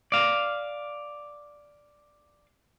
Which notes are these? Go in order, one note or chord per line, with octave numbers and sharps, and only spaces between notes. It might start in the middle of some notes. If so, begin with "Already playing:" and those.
D5 F5